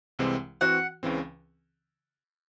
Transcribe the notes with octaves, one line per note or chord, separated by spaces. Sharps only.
C2 C3 E3 G#3 C4
E3 C4 F#4 F#5
C#2 C#3 E3 C4